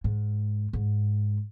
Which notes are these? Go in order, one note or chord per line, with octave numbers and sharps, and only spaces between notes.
G#2
G#2